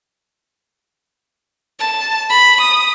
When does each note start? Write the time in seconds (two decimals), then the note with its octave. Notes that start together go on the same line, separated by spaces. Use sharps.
1.80 A5
2.30 B5
2.61 D#6